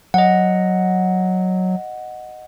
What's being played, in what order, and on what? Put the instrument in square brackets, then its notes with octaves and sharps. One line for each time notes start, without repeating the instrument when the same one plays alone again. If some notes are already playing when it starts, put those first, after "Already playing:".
[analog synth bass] F#3 [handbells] D#5 F#5